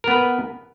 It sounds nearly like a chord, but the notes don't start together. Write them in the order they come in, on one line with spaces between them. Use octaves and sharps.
A#4 B3 B4